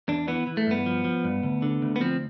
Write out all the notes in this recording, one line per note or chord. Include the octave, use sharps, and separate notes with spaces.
E2 D4
E3 B3
E3
A3
G2 B3
F3
F3
G2
D2
D3
D2
B3
F3 C4